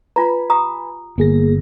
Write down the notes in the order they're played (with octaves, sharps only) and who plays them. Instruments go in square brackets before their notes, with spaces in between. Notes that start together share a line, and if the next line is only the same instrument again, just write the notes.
[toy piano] F4 A#5 [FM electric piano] B4 G#5 B5
[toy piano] G4 A#5 D#6
[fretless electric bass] G1 [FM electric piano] A#3 G#4 A#6